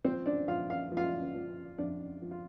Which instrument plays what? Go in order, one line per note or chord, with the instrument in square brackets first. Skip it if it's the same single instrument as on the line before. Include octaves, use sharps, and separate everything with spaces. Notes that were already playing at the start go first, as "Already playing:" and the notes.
[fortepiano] F3 C4 C5
D4 D5
F3 F4 F5
F5
F3
F4 F5
F3
F2 D4 D5
F3
F4